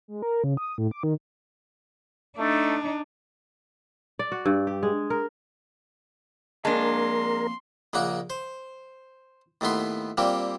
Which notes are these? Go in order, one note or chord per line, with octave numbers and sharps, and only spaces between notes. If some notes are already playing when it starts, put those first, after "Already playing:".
G#3
A#4
C#3
D#6
A2
D6
D#3
A3 D4 D#4
D5
F#4
G2
G4
G#3
A#4
F2 G#3 A#3 D4 A#4 A5 C6
A#1 C#3 A#3 F#5 A#5
C5
D#2 A2 A3 B3 C6
A#2 G3 A#3 C4